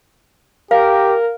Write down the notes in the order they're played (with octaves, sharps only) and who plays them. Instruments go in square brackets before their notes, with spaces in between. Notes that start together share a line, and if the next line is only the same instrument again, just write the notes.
[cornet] G4 [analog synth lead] A#4 [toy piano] F5